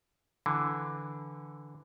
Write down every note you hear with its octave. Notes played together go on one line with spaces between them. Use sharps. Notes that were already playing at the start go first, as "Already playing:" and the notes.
D3 E3